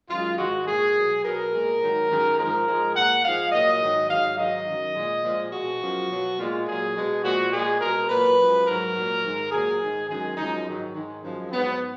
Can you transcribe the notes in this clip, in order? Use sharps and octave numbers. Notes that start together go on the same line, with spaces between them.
F#2 D#3 G#3 F4
G#2 D#3 G#3 F#4
A#2 G#3 G#4
B2 F#3
B2 F#3 A#4
A#2 G#3
G#2 D#3 F#3
F#2 D#3 G#3
G#2 F3 G#3 A#4
G#2 F3 G#3
A#2 G#3 F#5
G#2 F3 G#3 F5
A#2 F#3 D#5
G#2 D#3 F#3
G#2 F#3 F5
G#2 D#3 F#3 D#5
F#2 D#3 F#3
A#2 G#3
A#2 F3 G#3
B2 G#3 F#4
F#2 F3 G#3
B2 F#3
A#2 G#3 F4
A#2 F#3 G#4
B2 G#3
A#2 F3 G#3 F#4
A#2 G#3 G#4
B2 G#3 A#4
A#2 F#3 B4
F#2 F3 G#3
G#2 F#3 A#4
A#2 F#3
G#2 D#3 G#3
A#2 F#3 G#4
G#2 D#3 G#3
F#2 D#3 G#3 G#4
F#2 F3 G#3 D#4
G#2 D#3 F#3
G#2 D#3 G#3
F#2 F3 G#3
G#2 F#3 B3